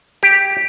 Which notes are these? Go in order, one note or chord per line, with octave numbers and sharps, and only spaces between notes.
G4